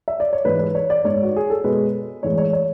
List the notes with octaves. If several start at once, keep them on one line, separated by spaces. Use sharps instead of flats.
E5
D5
C#5
G#2 E3 G#3 B4
B4
C#5
D5
G#2 G#3 C#5
F#4
G#4
A4
B2 G#3 B4
A2 E3 G#3 C#5
C#5
C#5